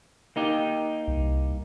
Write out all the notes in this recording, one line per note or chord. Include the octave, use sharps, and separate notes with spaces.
A#3 D#4 G4
C2